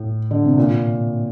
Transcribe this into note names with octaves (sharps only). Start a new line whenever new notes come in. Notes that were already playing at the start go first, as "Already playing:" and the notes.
Already playing: A2
D3
C3
A#2